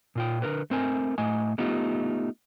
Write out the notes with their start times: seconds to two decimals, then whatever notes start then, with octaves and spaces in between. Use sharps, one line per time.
0.15 A#2 F4 G5
0.42 D3 E4 A#4 B4
0.70 A3 C4 A#4 G#5
1.18 A2 A3 D#5 G#5
1.58 A3 B3 D#4 F4 G4